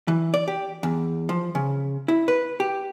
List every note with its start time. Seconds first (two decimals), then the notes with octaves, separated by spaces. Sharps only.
0.08 E3
0.34 D5
0.48 G4
0.83 E2
1.29 F3
1.55 C#3
2.08 E4
2.28 B4
2.60 G4